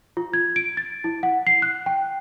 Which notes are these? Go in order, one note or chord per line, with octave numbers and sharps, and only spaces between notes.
F4
G#6
D7
A6
E4
F#5
C7
F#6
G5